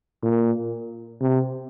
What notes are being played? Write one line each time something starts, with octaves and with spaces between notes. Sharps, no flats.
A#2
C3